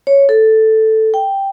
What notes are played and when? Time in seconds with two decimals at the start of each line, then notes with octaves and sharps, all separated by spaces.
0.07 C#5
0.29 A4
1.14 G5